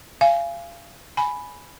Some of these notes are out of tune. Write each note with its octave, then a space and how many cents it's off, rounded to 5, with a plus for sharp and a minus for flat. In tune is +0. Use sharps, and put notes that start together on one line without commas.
F5 -30 G#5 +0
G#5 +10 B5 +0